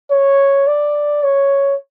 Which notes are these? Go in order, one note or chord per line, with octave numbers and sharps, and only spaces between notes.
C#5
D5
C#5